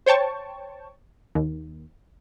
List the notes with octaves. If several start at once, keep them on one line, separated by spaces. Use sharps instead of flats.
C5 C#5 G5 A5 C#6
D#2